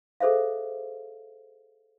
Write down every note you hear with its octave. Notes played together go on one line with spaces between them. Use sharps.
G#4 A4 C5 E5 F5